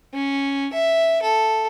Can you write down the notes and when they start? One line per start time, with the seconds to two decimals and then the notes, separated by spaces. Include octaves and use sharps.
0.14 C#4
0.73 E5
1.22 A4